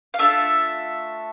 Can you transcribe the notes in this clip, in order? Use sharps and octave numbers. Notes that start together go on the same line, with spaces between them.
F5
A3 D4 F4 A4 E5